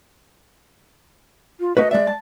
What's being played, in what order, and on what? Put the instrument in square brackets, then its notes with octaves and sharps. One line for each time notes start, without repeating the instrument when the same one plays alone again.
[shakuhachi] F4
[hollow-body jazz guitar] A3 F#4 B4 [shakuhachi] D#5
[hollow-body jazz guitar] G#3 E5 [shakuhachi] D5
[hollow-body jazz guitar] A5